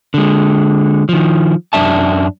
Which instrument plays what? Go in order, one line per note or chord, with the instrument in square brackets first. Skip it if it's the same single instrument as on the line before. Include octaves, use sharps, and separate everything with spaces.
[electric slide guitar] D3 G#3
D#3 F3
F#2 D4 E5 A5